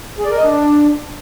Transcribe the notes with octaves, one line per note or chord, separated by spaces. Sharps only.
G#4
D5
A#4
D#5
D4